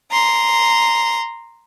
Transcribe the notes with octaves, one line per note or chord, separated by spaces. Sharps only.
A#5 C6